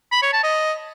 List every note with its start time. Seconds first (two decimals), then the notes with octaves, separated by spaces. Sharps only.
0.12 B5
0.22 C#5
0.33 A5
0.44 D#5